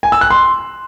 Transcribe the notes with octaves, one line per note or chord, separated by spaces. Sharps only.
G#5
E6
F#6
C6